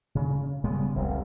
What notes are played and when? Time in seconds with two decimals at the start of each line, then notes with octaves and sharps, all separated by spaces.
0.15 C#3
0.64 C#3 G3 G#3 B3
0.95 F1 C2 F2